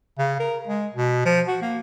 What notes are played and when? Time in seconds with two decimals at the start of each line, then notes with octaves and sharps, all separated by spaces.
0.18 C#3
0.40 A#4
0.68 G#3
0.95 B2
1.25 F3
1.48 F#4
1.62 A#3